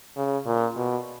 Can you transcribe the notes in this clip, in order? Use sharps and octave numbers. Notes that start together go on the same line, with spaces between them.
C#3
A#2
B2